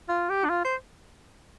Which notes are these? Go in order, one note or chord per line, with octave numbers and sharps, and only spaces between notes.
F4
G4
D4
F4
C5